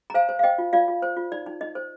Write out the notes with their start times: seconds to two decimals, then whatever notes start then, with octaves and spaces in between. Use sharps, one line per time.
0.10 A#5
0.14 C5 F5 G#5
0.29 C5
0.39 F5
0.43 C5 D#5 G5
0.58 F4
0.73 F4 D5 F5
0.88 F4
1.03 C5
1.17 F4
1.32 D#4 D5
1.46 D#4
1.61 D#4 D#5
1.75 C5